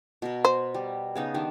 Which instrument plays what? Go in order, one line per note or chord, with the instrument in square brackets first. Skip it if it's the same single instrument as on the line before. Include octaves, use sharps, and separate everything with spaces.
[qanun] B2 A#4
[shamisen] C5
[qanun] G3
C#3 B3 D#4
D#3 G3 D4